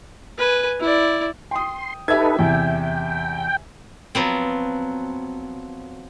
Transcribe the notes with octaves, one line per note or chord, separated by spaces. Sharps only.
B4 G#5
E4 D5
G5 C6 D#6
D#4 G4 A4 B4 E5 G#6
E2 C3 G5
F3 F#3 B3 C4